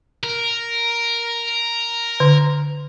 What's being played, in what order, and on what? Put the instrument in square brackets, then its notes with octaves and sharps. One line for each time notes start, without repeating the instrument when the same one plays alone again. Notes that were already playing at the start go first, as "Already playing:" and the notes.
[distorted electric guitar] A#4
[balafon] D3